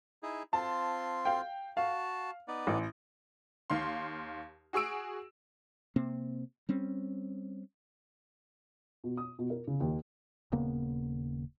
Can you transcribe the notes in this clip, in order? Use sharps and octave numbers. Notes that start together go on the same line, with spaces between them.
D#4 E4 G#4
C4 F4 A5 C6
F5 G5
F#4 F5 A5
B3 D#4 D5
A1
D#2 D#3 F5 C6
F#4 G#4 C#6 E6 D7
C3 A#3 C4
G3 C4 C#4
B2
D#6
B2
A#4
C#3
D#2
D#1 C#3 A#3 B3